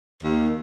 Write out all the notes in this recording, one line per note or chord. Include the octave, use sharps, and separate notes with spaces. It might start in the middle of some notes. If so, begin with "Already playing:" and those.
D#2